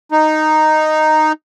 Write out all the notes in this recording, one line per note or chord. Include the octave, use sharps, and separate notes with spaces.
D#4